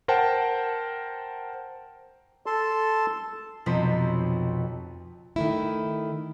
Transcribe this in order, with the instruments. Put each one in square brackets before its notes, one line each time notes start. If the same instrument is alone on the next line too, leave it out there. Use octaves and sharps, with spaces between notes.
[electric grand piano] A#4 C5 F#5 G5 A5
[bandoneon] A4 A5 C6
[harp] B1 F2 C3 C5 B5
[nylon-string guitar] D#3 A3 E4